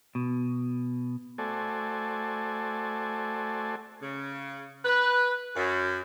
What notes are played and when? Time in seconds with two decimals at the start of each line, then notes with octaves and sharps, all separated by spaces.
0.15 B2
1.38 A3 F#4 A4 C5 D5 G#5
4.02 C#3
4.84 B4
5.56 F#2